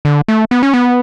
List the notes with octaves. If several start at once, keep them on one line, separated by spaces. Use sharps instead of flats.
D3
A3
B3
C#4
B3